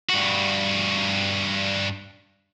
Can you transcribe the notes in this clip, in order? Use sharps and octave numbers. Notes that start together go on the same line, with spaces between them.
G2 F#4